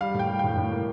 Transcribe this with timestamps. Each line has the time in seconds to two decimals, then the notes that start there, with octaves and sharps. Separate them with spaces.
0.01 G3 F5
0.14 A2
0.19 G5
0.29 G3
0.39 A2 G5
0.57 A2
0.72 A#3